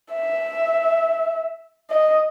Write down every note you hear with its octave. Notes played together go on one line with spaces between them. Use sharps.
E5
D#5